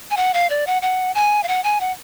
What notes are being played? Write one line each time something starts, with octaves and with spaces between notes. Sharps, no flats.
G#5
F#5
F5
D5
F#5
F#5
G#5
F5
F#5
G#5
F#5